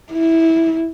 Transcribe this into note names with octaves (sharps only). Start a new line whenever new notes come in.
E4